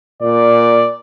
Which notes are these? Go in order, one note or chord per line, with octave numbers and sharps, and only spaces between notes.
A#2 D5